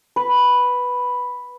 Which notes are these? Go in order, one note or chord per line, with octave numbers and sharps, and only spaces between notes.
B4